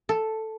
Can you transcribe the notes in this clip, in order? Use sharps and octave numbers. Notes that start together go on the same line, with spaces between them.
A4